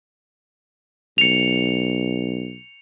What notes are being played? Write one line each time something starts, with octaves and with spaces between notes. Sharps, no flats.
B1 C#7 F7